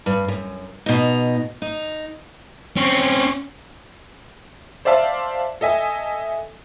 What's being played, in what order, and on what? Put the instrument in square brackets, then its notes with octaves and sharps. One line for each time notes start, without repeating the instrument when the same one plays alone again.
[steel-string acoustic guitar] G2
F#2
B2 D#4
D#4
[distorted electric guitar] C4 C#4
[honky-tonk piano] C5 D5 E5 F5 A5
A4 D#5 E5 G#5